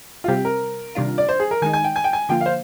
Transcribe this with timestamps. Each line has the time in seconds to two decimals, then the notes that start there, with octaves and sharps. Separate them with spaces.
0.24 F4
0.28 C3 G3 C4 G4
0.45 A#4
0.95 C3 D#3 G3 D4 F4
1.18 D5
1.29 C5
1.40 G#4
1.51 A#4
1.62 D#3 G#3 D#4 G#5
1.73 G#5
1.84 G5
1.96 G#5
2.04 G5
2.13 G#5
2.29 D3 F3 A#3 F4 G5
2.41 F5
2.46 C5